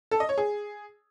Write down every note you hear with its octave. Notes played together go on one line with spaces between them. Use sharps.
A4
D#5
C#5
G#4